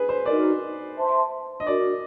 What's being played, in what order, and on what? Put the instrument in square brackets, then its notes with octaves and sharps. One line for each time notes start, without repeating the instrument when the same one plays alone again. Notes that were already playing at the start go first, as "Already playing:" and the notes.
Already playing: [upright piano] G#4 B4
C5
[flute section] D#4 F#4 A#4 D#5 [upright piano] D5
[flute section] C5 E5 A5 C6
[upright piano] D#5
[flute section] D4 F#4 A#4 [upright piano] D5